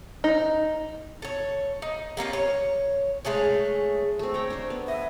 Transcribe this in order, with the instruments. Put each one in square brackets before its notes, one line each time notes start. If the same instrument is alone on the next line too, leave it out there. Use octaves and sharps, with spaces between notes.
[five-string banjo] D#4
[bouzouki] A4 C#5
D#4
G3 A#3 C#4 F4
C#5
G#3 A3 G#4 C#5
[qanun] A3 C4
C#5 G5 A#5
D4 C5
B3
[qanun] D#5 [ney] E5